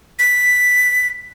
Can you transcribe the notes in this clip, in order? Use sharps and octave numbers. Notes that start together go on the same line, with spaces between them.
B6